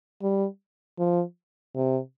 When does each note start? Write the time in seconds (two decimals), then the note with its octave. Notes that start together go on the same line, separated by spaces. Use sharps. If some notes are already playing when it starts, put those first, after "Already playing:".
0.22 G3
0.99 F3
1.75 C3